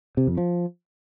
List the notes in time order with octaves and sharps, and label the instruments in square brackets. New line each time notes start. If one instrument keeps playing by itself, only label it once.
[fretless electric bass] C3
F2
F3